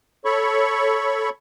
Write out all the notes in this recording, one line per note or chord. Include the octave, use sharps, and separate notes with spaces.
A4 C#5 B5 C#6